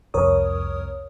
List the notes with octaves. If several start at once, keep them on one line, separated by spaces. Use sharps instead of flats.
C2 F2 A#4 C#5 D#6